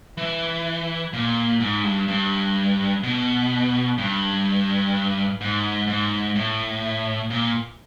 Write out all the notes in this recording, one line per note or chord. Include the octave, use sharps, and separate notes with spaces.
E3
A#2
G#2
G2
G2
B2
G2
G#2
G#2
A2
A#2